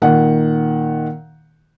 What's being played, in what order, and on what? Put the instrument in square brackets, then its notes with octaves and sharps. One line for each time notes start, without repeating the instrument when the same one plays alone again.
[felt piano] A#2 D#3 F#5